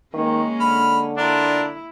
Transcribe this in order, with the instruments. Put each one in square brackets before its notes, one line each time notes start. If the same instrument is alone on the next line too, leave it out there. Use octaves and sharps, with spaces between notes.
[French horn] D#3 [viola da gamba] G#3 A#3 C#4
[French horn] D3 [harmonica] B5 F6
[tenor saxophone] D4 [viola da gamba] E4 [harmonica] F4 A#4